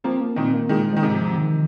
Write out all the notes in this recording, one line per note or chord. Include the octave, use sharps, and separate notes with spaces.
F3 A#3 C4
A#3
A#2 D#3 C4
A#3
A#2 D#3 G#3
F3
D#3 G#3
G#2 C3
F3
D#3